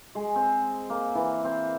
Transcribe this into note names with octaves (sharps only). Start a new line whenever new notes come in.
G#3
C4
A#3
E3
C4